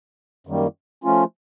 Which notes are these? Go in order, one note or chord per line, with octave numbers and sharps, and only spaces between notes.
F#2 D#3 G3 A#3
F3 A3 C#4 F4